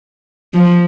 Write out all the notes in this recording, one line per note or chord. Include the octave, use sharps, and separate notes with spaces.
F3